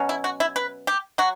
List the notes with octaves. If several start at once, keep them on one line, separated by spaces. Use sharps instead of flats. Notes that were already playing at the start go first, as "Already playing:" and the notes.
Already playing: B2 F#3 C#4
E4
F#4
E4
B4
G4
F#3 F#4